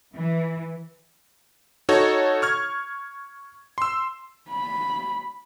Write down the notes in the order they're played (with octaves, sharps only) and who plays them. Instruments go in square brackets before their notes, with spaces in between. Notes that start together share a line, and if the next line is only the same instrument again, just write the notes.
[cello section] E3
[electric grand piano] D#4 F#4 A4 C#5
C#6 F6 G#6
C6 E6
[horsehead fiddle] B5